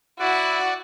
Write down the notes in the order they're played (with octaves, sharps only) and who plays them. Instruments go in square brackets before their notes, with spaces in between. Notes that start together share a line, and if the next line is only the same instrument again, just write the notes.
[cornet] E4 [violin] F#4 [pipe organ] D5 F#5